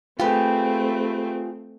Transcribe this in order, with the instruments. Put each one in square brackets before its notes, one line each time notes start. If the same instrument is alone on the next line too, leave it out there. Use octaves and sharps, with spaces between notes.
[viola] A3 C4 [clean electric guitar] F4 G#4 [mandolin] G4 B4